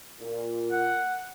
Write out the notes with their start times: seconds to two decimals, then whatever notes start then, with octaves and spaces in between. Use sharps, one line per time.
0.20 A#2
0.72 F#5